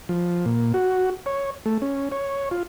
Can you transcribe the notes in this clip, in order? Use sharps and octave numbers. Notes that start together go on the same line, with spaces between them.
F3
A#2
F#4
C#5
A3
C#4
C#5
F4